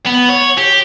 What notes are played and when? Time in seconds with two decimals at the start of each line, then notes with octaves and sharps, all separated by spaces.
0.06 B3
0.29 C#5
0.57 G4